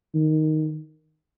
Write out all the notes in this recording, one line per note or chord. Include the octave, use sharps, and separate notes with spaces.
D#3